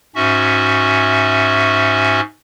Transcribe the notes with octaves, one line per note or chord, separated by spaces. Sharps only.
G#2 C#4 F#4 E5